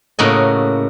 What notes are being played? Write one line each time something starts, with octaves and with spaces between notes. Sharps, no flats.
A2 C#3 A#3 F#4 D#5